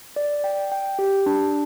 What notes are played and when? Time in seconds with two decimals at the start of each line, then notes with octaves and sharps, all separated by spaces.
0.16 D5
0.44 G5
0.72 G5
0.99 G4
1.26 D4